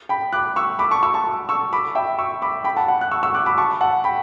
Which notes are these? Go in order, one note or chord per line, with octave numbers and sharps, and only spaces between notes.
G5 B5
D6 F#6
C#6 E6
B5 D6
A5 C#6
C#6 E6
A5 C#6
C#6 E6
B5 D6
E5 G5
C#6 E6
B5 D6
G5 B5
F#5 A5
F#5
F#6
C#6 E6
C#6 E6
D6 F#6
B5 D6
A5 C#6
F#5 A5
G5 B5